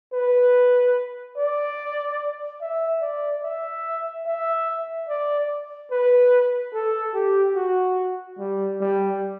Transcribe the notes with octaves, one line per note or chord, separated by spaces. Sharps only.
B4
D5
E5
D5
E5
E5
D5
B4
A4
G4
F#4
G3
G3